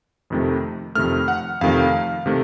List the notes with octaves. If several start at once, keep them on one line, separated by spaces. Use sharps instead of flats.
F2 C3 D#3 A3
F2 C3 D#3 A3 F6
F#5
F2 C3 D#3 A3 F5
C3 D#3 A3